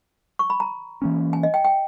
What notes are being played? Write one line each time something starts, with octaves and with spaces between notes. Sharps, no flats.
C#6
B5
A#5
E3 A#3 C#4
G#5
D#5
G5
G5